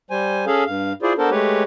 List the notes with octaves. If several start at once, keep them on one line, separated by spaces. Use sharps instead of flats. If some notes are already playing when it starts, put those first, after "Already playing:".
G3 C5 G#5
C#4 G#4 A4 F5
G2 F5
E4 F4 G#4 C5 D5
B3 D4 A4 A#4 C5
G#3 A3 G4 B4 C#5